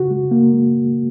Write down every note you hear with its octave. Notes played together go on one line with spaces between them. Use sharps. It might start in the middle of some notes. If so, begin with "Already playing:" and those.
Already playing: C#3 F#4
G#3
A#3
G#3